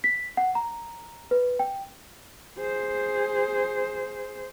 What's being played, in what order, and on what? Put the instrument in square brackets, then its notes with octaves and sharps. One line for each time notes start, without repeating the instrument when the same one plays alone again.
[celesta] B6
F#5
A#5
B4
G5
[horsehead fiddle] G#4 C5